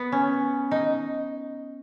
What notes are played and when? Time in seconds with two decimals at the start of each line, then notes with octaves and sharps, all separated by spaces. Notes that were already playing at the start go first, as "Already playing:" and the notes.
Already playing: B3
0.12 C#4
0.71 D#4